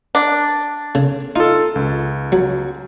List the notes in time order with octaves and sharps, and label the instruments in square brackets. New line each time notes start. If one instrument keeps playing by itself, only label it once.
[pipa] D4
[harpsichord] C#3
[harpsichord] D#4 [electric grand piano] F4 A4
[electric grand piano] C#2
[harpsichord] F#3